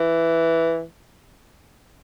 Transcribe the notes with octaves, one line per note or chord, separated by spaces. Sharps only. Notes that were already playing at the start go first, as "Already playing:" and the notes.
Already playing: E3